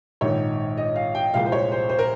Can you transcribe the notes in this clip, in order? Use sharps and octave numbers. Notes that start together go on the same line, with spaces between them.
A#1 G#2 D#3 C#5
D#5
F5
G5
C2 A#2 F3 G#3 F5
C5
C#5
C5
C5
A#4